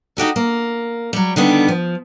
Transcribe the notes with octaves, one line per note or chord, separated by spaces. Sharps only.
D#4 F#4 G4 A4
A#3
F#3 G3
D3 D#3 G3 B3 G4
F3